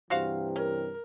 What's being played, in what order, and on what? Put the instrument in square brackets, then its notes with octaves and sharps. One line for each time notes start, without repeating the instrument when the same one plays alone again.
[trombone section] G2 C3 E3 [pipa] F#4 C5 F5
[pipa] C#4 [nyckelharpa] A#4